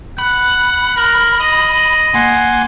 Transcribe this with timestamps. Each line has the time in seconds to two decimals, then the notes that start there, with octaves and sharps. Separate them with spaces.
0.19 F#5 B5
0.97 A#4
1.40 D#5
2.14 A#3 F#5 G#5 C6